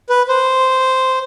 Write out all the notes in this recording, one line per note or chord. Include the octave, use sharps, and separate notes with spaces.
B4
C5